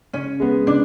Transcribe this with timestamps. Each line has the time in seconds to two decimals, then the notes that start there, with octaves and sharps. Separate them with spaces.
0.13 C#3 C#4
0.40 G#3 B3
0.67 C#3 D4